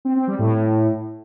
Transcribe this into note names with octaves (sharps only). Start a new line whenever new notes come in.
C4
C4
G3
A2